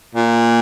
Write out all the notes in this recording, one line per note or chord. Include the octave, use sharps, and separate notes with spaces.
A#2